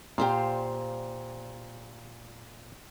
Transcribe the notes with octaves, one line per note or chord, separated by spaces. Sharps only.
A#2 G4 C5 F5